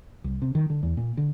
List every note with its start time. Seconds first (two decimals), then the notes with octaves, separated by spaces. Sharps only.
0.24 C2
0.42 C3
0.55 D#3
0.70 D3
0.83 E2
0.97 A#2
1.17 D3